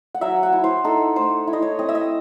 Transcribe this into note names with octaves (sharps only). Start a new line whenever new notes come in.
F#5
F#3 E5
F#5
E4
C5
D#4 A4
A3 C5
E4
D#5
C#5
C4 D#5
E5
D#5